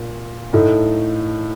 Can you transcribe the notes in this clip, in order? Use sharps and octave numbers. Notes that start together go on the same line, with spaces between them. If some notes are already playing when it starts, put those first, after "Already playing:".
Already playing: A#2
A2 A3 D#4